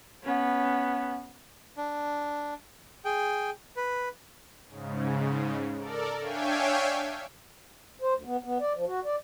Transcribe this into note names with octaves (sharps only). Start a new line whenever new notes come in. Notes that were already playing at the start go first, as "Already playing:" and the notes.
B3 C#4
D4
G#4 G5
B4
G#2 C#3
A4 A#4 D5
D4 C#5 E5 F5 G5 G#5
C5
D2
B3
B3
D5
F3
F#4
D5